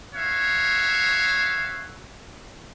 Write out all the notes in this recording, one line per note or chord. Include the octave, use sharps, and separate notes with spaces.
F#4 C#5 E5 F5